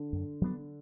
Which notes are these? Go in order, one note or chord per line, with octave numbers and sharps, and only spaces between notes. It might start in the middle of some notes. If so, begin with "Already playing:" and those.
Already playing: D3
F#2
F#3 B3 D4